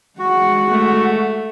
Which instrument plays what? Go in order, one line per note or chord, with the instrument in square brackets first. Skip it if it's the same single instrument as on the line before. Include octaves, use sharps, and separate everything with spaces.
[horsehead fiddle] G#3 F#5 [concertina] F#4
[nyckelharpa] A3